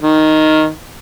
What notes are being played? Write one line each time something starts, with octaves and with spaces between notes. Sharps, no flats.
D#3